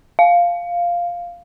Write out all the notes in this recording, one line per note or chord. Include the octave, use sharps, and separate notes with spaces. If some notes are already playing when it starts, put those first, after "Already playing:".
F5